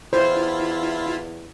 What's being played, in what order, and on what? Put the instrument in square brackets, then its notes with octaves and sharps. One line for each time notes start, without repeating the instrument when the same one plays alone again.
[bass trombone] E2 [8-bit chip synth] E4 F4 [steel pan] C5